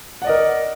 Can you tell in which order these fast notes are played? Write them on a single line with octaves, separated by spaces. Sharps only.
F#5 D5 D#5 A#4